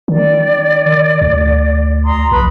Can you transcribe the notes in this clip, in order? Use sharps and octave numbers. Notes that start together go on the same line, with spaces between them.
D#3 D5
D2
A#5 C6 D#6
A#1 B4 B5